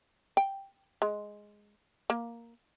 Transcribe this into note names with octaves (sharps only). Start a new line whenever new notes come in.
G5
G#3
A#3